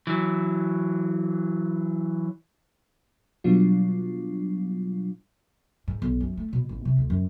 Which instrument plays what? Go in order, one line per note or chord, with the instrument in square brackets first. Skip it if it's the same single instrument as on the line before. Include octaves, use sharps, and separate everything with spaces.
[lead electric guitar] E3 F#3
[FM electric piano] B2 F#3 G3 B3 D4 F4
[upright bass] G#2
B1
F#2
A3
B2
A1
C3
D2
F#2